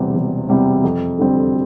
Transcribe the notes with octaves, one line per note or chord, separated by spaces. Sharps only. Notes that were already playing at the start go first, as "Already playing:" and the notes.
Already playing: E1 E2 C3 G3 C4
E1
E2 C3 G3 C4
F2
D3 G3 C4